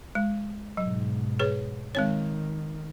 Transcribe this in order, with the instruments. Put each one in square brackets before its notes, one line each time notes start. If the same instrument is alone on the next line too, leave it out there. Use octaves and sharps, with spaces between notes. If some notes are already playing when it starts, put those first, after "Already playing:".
[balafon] G#3
[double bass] G#2 B2 [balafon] F#3
[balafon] G#4 B4 C#5
[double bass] D#3 [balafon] G#3 C4 C#5